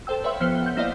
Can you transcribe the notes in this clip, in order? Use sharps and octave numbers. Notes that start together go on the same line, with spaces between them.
A4 C5 G5 E6
B4 C#5 E5 F5 G5 C6
F3 B3 C5 F6 C#7 G7
F#5 G6
A#3 E4 C5 D5 D#5 F5